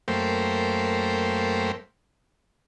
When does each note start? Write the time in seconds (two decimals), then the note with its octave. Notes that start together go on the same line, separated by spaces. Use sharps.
0.08 F#2 A3 A#3 C5 G5